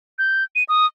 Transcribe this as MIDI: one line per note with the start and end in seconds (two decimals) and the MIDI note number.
0.19 0.44 91
0.55 0.63 99
0.69 0.86 87